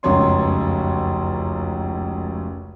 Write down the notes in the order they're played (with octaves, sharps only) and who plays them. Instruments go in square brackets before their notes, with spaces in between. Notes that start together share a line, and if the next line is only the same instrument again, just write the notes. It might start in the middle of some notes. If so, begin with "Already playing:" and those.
[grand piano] F1 C#2 F#2 C#5 C6